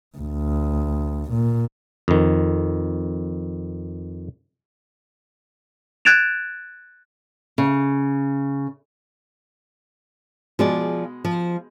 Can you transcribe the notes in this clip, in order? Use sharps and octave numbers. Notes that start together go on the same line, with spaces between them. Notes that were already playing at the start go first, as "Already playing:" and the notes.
D2
A#2
F2 D#3
F#6 G#6 A6 D7 E7 F7
C#3
B2 F3 G#3 G#4 D5
F3